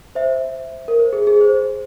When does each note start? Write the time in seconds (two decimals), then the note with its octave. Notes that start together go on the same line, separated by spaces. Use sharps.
0.15 C5 E5
0.88 A#4
1.00 C5
1.13 G#4
1.27 G#4
1.41 C5